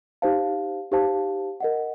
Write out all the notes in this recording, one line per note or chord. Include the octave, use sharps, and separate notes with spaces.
D#4 G4 C5 F5 A5
D#4 G4 C5 F5 A5
A#4 D#5 F#5